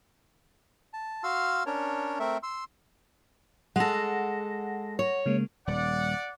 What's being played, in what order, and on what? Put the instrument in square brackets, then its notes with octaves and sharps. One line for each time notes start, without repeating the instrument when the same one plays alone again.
[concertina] A5
F#4 F5 C6 E6 F6
C#4 D4 A#4 C#5
A3 C4 A#4 E5
C6 E6
[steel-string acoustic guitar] G#3 A4 [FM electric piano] F#5 A#6
[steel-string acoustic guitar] C#5
[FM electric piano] C#3 G#3 A#3
[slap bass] D#1 G3 [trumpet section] D5 F#5